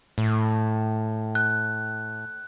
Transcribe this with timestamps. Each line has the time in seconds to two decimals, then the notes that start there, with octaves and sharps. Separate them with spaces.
0.18 A2
1.35 F#6